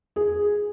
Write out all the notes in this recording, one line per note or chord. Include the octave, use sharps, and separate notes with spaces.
G#4